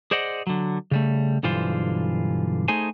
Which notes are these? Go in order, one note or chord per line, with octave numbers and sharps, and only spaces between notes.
G#4 C5 D5 D#5 F#5
D3 F#3
C#3 G3 A3
B1 G2 D3 E3 F4 C5
A3 D#4 G#4 C5 G#5